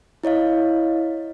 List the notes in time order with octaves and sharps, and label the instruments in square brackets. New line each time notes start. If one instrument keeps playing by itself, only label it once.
[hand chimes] E4 C#5 D#5 F5